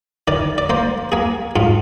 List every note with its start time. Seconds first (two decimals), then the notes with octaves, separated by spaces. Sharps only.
0.28 D#3 D5
0.58 D5
0.70 A#3 C5
1.12 A#3 G#4
1.56 G#2 F4